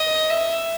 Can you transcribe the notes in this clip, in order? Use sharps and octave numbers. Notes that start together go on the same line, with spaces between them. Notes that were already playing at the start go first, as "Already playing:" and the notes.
Already playing: D#5
E5